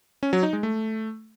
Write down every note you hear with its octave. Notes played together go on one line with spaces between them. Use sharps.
C#4
F#3
D#4
G#3
A3